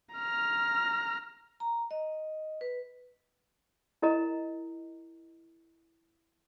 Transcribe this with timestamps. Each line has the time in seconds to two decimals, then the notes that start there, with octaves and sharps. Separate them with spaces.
0.15 A#5 F6
1.60 A#5
1.91 D#5
2.61 B4
4.02 E4 A#4 D#5 A#5